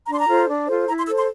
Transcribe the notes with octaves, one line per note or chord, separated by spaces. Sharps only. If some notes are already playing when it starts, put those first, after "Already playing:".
D4 A#5
C6
A#5
F4 A4 C5
D4
F4 A4 C5
E4 A#5
C6
A4 C5 E6
C6